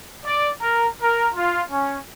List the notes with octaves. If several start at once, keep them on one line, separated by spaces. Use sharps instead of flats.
D5
A#4
A#4
F4
C#4